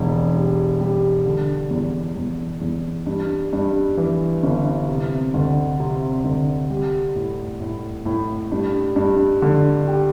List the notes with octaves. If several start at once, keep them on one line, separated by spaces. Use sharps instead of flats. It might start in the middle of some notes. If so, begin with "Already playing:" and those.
Already playing: E1
G3
G3
D3
E2
E2
E2
G2
G2
E3
G1
C3
D2
C3
D2
G3
A2
A2
A2
G2
G2
D3
G4